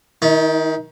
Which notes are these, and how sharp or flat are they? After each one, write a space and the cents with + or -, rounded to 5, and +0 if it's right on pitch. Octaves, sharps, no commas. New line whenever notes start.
D#3 +15 E4 -40